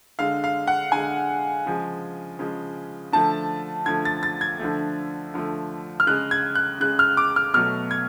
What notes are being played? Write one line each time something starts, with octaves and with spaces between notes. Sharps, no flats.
D3 G#3 F5
F5
F#5
D3 G#3 G#5
C#3 F3 G#3
C#3 F3 G#3
D3 F3 A3 A5
D3 F3 A3 G#6
A6
A6
G#6
D3 F3 A3
D3 F3 A3
F6
C#3 G#3 F#6
G#6
F#6
C#3 G#3 F#6
F6
D6
F6
B2 F#3 A3 F6
G#6